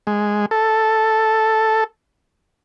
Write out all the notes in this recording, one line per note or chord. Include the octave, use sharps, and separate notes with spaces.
G#3
A4